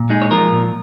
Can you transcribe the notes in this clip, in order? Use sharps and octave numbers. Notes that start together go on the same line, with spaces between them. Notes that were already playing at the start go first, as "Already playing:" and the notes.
Already playing: A#2
G#3 D#4 G#4
C#5
F3 F4 A#4
A#2